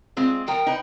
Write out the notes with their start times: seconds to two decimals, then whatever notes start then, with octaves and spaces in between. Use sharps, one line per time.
0.17 G#3 C4 F4
0.47 F3 A#4 G5
0.66 D#4 B4